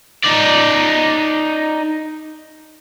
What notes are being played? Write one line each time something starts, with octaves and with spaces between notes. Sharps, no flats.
D#4 D5